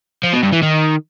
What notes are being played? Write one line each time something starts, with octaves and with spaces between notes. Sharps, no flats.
F3
B2
G2
E3
D#3